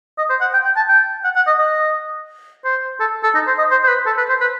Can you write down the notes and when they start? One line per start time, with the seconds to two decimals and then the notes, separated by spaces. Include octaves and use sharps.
0.18 D#5
0.30 C5
0.41 F#5
0.53 G5
0.65 G5
0.76 A5
0.89 G5
1.24 F#5
1.36 F#5
1.47 D#5
1.59 D#5
2.64 C5
3.00 A4
3.23 A4
3.35 D#4
3.47 C5
3.58 D#5
3.71 C5
3.83 C5
3.88 B4
4.06 A4
4.18 B4
4.29 C5
4.41 B4